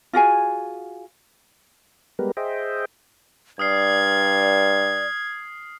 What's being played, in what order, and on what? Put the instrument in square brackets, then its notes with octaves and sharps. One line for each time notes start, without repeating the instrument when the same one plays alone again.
[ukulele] F4 F#4 G#4 G#5
[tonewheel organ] G3 G#3 B3 G4 A#4 B4
G#4 C5 D#5 E5 G5
[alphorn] G2 [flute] D5 [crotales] D#6 F6 C7 [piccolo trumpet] G#6